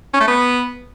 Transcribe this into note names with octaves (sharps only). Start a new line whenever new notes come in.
C#4
A3
B3